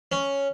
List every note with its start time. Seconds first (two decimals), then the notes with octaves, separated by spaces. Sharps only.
0.12 C#4